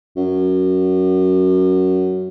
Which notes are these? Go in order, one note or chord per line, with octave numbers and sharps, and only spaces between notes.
F#2